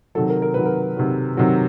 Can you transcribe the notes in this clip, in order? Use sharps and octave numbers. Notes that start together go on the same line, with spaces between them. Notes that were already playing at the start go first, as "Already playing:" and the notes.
C3 D#3 F#3 A4
A#4
A#4
C3 D#3 F#3 B4
A#4
C3 D#3 F#3
C3 D#3 F#3